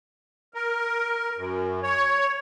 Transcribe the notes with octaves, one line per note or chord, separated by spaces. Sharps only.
A#4
F#2
C#5